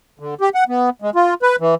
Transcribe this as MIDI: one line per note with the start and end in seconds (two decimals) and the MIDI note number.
0.20 0.34 50
0.41 0.49 67
0.55 0.64 78
0.69 0.90 59
1.02 1.10 56
1.15 1.34 65
1.42 1.56 71
1.60 1.75 52